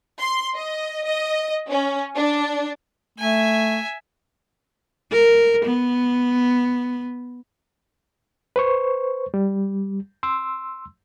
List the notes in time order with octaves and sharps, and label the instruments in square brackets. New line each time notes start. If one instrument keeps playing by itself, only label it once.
[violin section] C6
D#5
D#5
C#4
D4
[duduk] A3 [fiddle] E5 G#5
[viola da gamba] A#4
B3
[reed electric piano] B4 C5 C#6
G3
C6 E6